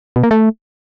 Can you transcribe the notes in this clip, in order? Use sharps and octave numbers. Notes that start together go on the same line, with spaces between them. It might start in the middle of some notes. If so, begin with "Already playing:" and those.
B2
A#3
A3